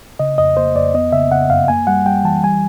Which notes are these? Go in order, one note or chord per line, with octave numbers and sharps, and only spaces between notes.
C#3 D#5
F2 D#5
A#3 C5
F2 D5
B3 D#5
C#3 E5
C#3 F#5
F#2 F5
A#3 G#5
G3 F#5
G3 G5
E3 A5
G3 G#5